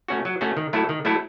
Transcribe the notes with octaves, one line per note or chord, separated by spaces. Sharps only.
A3 C#4 F#4
F#3
A3 C#4 F#4
D#3
F#3 A3 E4 A4
D#3
F#3 A3 E4 A4